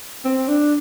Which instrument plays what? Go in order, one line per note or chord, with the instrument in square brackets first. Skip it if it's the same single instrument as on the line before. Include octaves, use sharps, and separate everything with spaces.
[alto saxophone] C4
D4